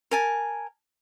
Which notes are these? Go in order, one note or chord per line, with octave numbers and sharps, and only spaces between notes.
A#4 G#5 A5